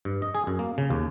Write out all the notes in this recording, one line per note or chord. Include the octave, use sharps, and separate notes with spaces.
G2
D#5
G#4
F#2
A#3
C#3
D#2